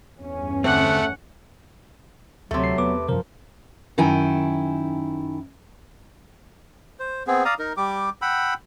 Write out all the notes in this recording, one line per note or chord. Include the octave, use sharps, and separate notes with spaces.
E2 G2 C#4
D3 A3 C4 F#5
D2 C3 F#3 A3
C7
E2 B3 B4 D6
F#2 C3 F3 A#4 C5
F#2 D#3 D#4 E4 G5 G#5
C5
B3 C4 G#4
D5 F5 A#5 D#6
D#4 A#4
G3 G4 D6
F#5 G5 B5 E6